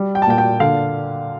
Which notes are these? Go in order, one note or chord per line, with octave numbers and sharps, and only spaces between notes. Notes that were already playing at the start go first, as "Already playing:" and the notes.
Already playing: G3
G5
A5
A#2 G5
G5
D3 F5